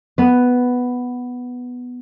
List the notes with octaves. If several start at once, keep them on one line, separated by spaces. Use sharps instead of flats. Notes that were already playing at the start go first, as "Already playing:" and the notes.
B3 B4